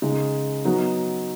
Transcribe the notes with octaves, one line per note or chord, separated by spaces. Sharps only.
C#3 G#3 D#4
F#3 B3 D#4